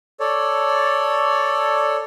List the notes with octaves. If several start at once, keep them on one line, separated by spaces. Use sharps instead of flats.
A4 C#5 D5